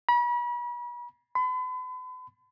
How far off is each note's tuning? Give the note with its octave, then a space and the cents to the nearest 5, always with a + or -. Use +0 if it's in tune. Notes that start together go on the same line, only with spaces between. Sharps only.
B5 -40
B5 +40